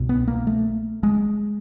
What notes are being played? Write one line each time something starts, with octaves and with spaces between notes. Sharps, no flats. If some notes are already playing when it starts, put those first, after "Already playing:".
Already playing: C2 B2
B3
A#3
A3
G#3